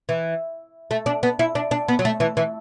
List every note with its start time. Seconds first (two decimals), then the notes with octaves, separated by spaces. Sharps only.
0.09 E3
0.91 A3
1.06 D4
1.23 B3
1.39 E4
1.55 D4
1.71 D4
1.88 B3
1.99 F#3
2.05 A3
2.20 E3
2.37 E3